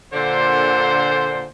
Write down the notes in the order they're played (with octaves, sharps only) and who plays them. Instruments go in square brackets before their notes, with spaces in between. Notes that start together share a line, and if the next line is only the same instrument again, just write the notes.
[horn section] A#2 D3 C5